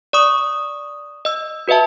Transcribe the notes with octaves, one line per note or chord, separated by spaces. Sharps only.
D5 C#6 D#6
D#5 E6
F#4 B4 D#5 E5 A5